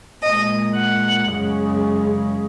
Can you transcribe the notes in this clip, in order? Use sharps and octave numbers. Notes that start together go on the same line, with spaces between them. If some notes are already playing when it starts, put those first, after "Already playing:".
A#2 G#3 D#5
F#5
F#2 C#3 G#3